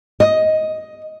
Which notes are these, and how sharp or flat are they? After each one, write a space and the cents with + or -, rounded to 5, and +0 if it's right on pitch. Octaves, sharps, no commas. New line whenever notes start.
D#5 +10